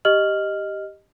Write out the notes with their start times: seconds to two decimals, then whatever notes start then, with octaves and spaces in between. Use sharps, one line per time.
0.05 G4 D#5 F6 F#7